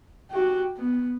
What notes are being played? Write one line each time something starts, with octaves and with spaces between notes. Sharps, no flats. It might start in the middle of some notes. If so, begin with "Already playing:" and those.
F#4 G4
B3